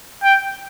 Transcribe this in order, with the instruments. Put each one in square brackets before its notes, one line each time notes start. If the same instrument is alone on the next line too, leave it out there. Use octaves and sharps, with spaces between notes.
[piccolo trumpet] G5